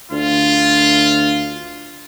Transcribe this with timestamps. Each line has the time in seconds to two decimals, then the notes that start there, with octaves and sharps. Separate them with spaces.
0.11 D2 F4